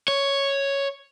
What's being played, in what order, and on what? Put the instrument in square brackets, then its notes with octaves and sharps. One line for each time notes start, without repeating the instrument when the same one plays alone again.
[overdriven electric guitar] C#5